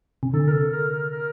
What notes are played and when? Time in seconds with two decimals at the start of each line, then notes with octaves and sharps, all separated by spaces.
0.23 C3
0.34 D3 A4
0.48 A#4
0.53 A4
0.72 A#4
0.91 A#4
1.11 A#4